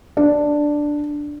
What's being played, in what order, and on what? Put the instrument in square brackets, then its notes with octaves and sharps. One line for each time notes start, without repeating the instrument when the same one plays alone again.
[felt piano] D4